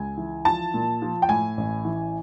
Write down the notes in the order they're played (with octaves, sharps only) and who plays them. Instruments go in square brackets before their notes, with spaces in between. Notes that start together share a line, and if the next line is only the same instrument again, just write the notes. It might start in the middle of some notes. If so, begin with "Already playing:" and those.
Already playing: [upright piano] C#2 G#5
E3
F3 A5
A#2
F3
G5
A2 G#5
A1
E3